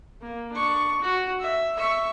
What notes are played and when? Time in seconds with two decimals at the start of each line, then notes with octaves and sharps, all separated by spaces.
0.22 A#3
0.53 D4 C#6
1.01 F#4
1.40 E5
1.76 E5 C#6